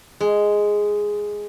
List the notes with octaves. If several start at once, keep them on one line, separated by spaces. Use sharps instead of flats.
G#3